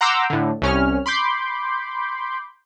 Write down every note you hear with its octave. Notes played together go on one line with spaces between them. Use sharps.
F#5 A#5 C6 D6 E6 G6
A2 D3
C2 C#4 F6
B5 C6 D6 G6